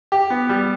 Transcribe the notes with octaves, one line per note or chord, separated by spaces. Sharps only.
G4
B3
G3